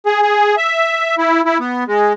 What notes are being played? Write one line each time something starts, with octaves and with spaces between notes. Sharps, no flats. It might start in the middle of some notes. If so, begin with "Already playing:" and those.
G#4
G#4
E5
E4
E4
B3
G#3